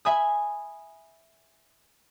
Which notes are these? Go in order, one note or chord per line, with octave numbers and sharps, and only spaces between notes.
E5 G#5 B5 D#6